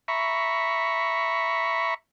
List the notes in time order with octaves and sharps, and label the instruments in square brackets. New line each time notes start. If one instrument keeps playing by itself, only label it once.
[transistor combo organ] E5 A#5 B5 C#6